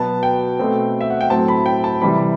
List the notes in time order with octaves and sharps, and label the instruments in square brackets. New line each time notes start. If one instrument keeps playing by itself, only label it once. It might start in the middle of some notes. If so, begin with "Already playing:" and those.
Already playing: [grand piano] B2 F#3 B3 A5
G5
B2 A3 C4
E5
F#5
G5
A2 F#3 C4 A5
B5
G5
A5
C3 E3 G3 B5